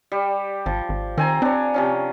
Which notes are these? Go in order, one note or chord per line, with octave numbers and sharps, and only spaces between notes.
G3 G4
G#1 F3
G#1
D#3 C4 G#5 A#5
C4 D4 C#5
C3 F3 C#4